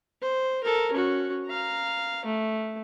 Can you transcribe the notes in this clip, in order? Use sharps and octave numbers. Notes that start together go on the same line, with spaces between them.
C5
A4 A#4
C#4 F#4
F5 A#5
A3